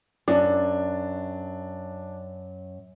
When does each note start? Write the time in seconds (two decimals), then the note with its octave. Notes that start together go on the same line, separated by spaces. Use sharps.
0.28 F#2 D4